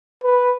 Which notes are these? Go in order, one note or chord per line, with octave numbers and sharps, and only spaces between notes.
B4